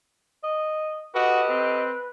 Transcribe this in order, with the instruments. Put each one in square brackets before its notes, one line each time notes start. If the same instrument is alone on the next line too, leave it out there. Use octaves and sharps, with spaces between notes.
[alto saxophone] D#5
[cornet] F#4 [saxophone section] G4 A4 D#5 [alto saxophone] B4
[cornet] C4